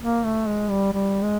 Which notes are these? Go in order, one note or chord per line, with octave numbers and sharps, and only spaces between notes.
A#3
A3
G#3
G3
G3
G#3